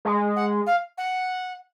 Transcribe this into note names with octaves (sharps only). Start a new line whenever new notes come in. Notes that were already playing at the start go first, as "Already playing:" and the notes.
G#3
F#5
F5
F#5